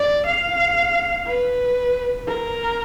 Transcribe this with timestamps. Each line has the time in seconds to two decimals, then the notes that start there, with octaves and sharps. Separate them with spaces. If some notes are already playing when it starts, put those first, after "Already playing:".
Already playing: D5
0.26 F5
1.27 B4
2.28 A#4